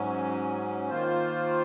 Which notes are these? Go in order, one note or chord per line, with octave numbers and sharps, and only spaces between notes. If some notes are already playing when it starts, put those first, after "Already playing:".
Already playing: G#2 F#3 C#4
D#3 A#3 F4 C5